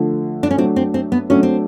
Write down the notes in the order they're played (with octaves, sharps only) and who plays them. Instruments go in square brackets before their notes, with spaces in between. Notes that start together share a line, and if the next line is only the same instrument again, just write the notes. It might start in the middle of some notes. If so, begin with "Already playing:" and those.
Already playing: [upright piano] D3 F3 A3
[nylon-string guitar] D4
C#4
[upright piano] F#3 A3 D4 [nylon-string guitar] C4
[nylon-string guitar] C4
C4
B3
[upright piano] F#3 A3 D4 [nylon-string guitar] C#4
[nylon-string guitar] C4